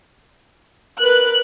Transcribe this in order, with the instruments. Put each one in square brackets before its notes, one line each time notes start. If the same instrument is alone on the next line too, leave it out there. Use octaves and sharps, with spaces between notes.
[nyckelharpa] A#4 B4 [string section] F#6